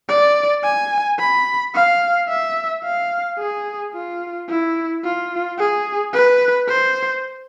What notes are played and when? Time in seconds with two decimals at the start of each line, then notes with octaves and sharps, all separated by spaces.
0.09 D5
0.63 G#5
1.19 B5
1.74 F5
2.28 E5
2.84 F5
3.39 G#4
3.94 F4
4.48 E4
5.04 F4
5.58 G#4
6.13 B4
6.68 C5